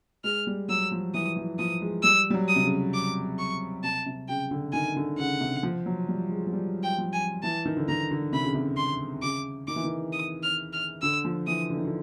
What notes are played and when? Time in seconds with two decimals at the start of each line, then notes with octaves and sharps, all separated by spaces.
0.24 G#3 F6
0.47 G3
0.69 F#3 E6
0.92 F3
1.14 E3 D#6
1.36 E3
1.59 F3 D#6
1.81 G#3
2.03 G3 E6
2.30 G3
2.34 F#3
2.49 D#6
2.56 C3
2.64 C#3
2.94 D6
3.39 C#6
3.83 C3 A5
4.06 C3
4.29 C#3 G5
4.51 D3
4.73 D#3 G#5
4.96 D3
5.18 C#3 F#5
5.41 C3
5.63 F3
5.86 F#3
6.08 G3
6.30 G#3
6.47 F#3
6.53 G3
6.83 G5
6.98 F3
7.13 G#5
7.43 E3 A5
7.65 D#3
7.77 D3
7.89 D#3 A#5
8.11 D3
8.33 C3 B5
8.44 C#3
8.55 C3
8.77 C6
9.23 C#3 D6
9.68 D#3 D6
9.76 E3
9.84 D#3
10.13 D#6
10.43 F6
10.73 F6
11.02 D3 E6
11.25 F3
11.47 E3 D#6
11.70 D3
11.77 D#3
11.85 D3